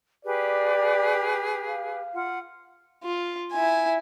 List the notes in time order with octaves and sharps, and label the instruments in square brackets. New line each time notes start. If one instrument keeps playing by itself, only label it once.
[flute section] G4 G#4 B4 [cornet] D5
[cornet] F5
[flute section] F4 F#5
[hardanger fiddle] F4
E4 G#5